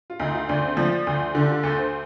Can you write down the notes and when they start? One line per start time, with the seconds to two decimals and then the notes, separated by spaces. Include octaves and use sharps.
0.10 F4
0.20 D2 D#4
0.34 F4
0.48 D2 D4
0.62 C4
0.77 F3 D4
1.07 D2
1.35 D3 D4
1.44 G4
1.50 F4
1.63 D2 A4
1.79 C5